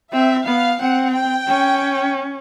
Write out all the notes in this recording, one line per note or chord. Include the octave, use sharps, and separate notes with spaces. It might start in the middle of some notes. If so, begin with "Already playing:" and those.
C4 E5
B3 F5
C4 F#5
G5
C#4